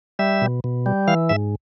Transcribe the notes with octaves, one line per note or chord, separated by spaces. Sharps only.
G3 E5
B2
B2
G3
E3 F5
G#2 E5